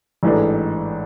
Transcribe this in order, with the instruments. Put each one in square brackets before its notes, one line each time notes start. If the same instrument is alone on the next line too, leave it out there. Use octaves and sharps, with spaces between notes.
[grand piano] A1 G#2 E3 A3 D4